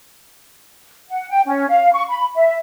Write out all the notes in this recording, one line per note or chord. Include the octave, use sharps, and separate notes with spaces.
F#5
G5
C#4
F5
C#6
B5
E5